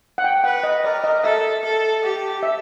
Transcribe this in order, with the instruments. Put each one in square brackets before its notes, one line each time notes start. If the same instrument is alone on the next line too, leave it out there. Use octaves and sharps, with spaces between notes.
[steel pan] F#5
G5
[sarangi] B4 [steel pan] F#5
[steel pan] D#5
[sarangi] A#4 [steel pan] D5
[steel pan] D#5
[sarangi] A4 [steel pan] E5
[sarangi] A4
G4
[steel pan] E5